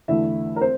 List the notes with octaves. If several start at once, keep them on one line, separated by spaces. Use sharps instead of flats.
E2 D3 A3 E4 E5
A#4
C4 C5